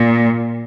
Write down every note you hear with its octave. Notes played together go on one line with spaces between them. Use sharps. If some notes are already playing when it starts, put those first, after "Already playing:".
Already playing: A#2